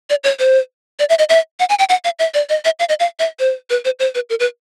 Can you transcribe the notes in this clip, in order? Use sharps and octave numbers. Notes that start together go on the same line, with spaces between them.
D5
C#5
C5
D5
E5
D#5
E5
F#5
G#5
G5
F#5
F5
E5
D5
D#5
E5
F5
D#5
F5
E5
C5
B4
C5
C5
B4
A#4
B4